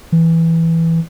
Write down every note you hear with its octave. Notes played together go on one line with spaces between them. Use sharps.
E3